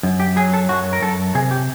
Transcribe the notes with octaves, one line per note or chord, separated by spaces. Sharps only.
F#2
G4
F#3 G#4
A4
F#2 F#4
A#4
F#2 A4
C3 G#4
G4